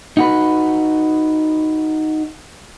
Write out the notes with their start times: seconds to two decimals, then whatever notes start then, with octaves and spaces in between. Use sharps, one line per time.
0.17 D#4 F#4 B4